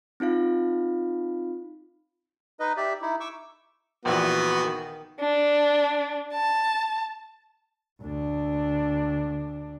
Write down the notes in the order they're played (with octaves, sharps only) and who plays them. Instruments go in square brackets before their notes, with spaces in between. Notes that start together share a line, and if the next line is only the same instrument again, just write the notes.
[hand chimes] C4 D#4 F4 F5
[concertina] D#4 B4 D#5
G4 D5 E5
D#4 E4
C#6 D6 E6
[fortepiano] A#1 A#2 E3 [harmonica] B3 F#4
[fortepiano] D#3
[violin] D4
A5
[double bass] D2 D4